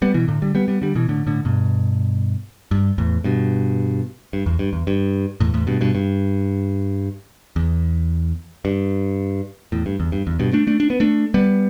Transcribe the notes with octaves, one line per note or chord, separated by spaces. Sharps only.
G3 B3
B2 E3
A2 D3
D3 G3
G3 B3
G3 B3
D3 G3
B2 E3
A2 D3
A2 D3
G2 B2
G2
E2 A2
G2 B2
G2
E2
G2
E2
G2
E2 A2
E2 A2
G2 B2
G2 B2
G2
E2
G2
E2 A2
G2
E2
G2
E2
G2 B2
A3 D4
A3 D4
D4
B3
A3 D4
G3 B3